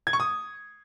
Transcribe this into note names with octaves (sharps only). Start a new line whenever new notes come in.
G#6
C#6
D#6